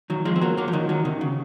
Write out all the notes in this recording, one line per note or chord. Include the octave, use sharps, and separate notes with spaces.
D#3 F#3
F3 G#3
C4
F#3 A#3
F#3 A#3
F3
D#3 F#3
D#3 F#3
C3 D#3
C#3